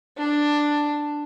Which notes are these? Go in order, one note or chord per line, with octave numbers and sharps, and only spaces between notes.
D4